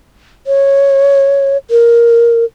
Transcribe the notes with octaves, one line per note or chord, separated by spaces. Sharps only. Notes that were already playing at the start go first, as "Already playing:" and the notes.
C#5
A#4